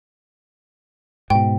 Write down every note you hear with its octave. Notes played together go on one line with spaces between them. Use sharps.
G#2 B2 G5